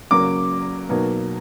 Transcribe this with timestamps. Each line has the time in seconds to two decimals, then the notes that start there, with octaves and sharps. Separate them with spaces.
0.11 C#3 F#3 A#3 D6
0.89 B2 F#3 A#3 D#4